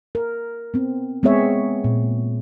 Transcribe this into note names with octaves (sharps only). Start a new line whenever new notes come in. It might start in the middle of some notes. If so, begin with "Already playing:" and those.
A#4
B3 C4
G#3 B3 C4 G#4 C#5 E5
A#2